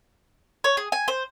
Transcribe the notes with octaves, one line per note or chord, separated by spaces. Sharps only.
C#5
G#4
G#5
C5